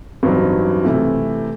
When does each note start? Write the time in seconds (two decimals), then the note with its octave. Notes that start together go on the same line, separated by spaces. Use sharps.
0.23 A1 G2 F#3 C4 D#4
0.84 C3 E3 A3 E4